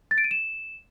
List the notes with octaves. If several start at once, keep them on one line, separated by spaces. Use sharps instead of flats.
A6
D7
D#7
E7